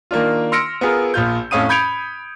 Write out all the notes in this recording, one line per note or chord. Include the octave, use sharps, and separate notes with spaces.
D#3 A#3 D4 F4
C6 E6 F6 A#6 C#7 D7
B3 F4 G#4 A#4
A#1 A#2 F4 G6
F2 A2 C#4 F5 D#6 D#7
B5 G6 G#6 C#7 D7 F7